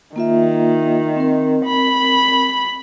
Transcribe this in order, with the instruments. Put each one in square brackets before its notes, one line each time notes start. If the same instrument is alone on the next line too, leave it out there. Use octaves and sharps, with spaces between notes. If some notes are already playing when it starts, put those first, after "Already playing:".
[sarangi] D#3 [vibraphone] A#3 F4 E5
[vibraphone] C4 A#4
[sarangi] B5